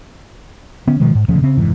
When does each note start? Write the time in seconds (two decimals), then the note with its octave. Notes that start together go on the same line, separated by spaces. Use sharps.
0.87 D3 B3 C#4
1.00 B2 D#3 F3 G#3
1.15 G#2
1.28 D#1 D2 C#3 F3
1.42 C#3 C4
1.57 F1 G#2 E3